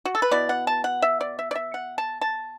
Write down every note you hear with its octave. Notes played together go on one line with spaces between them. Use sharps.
F#4
A4
B4
B2 B3 E4 D5
F#5
A5
F#5
E5
D5
E5
D5
E5
F#5
A5
A5